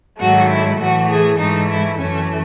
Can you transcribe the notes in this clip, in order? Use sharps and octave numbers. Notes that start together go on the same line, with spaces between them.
G#2 D#3 F#3 A3 F#4
E4
A2 E3 A3 F#4
G#4
G#2 E3 A3 D#4
E4
F#2 E3 A3 C#4